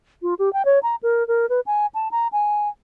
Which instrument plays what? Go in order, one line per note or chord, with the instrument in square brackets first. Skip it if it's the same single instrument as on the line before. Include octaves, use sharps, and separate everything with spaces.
[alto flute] F4
G4
G5
C#5
A#5
A#4
A#4
B4
G#5
A5
A#5
G#5